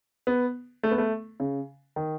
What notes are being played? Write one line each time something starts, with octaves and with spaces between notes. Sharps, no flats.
B3
A3
B3
A3
C#3
D#3